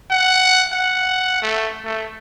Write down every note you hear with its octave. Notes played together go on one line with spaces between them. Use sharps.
F#5
F#5
A3
A3